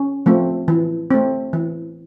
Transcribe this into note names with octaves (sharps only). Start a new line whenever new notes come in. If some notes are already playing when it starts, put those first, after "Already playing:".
Already playing: C#4
F3 A3 C4
E3
A3 C4
E3